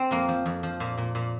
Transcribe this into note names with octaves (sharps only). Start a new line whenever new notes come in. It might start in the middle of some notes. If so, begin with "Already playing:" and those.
Already playing: C4
F2 A#3
F3
F2
F3
A#2
A#2
A#2